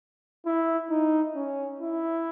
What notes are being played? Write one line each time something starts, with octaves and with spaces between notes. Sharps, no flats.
E4
D#4
C#4
E4